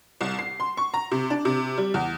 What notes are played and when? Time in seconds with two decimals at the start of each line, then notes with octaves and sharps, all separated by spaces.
0.21 C2
0.39 C7
0.60 C6
0.77 C#6
0.94 A#5
1.11 C3
1.30 D4
1.45 C3
1.78 G3
1.94 E2